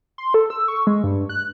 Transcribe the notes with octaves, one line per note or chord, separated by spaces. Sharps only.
C6
A4
E6
C#6
G#3
G2
F#6